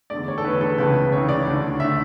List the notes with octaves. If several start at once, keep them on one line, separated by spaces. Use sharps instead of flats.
E2 D3 A3 D5
C#5
A4
E2 D3 A3 B4
A4
C#2 C#3 E3 B4
C#2 C#3 E3 C#5
D5
D2 D3 A3
D3 A3 E5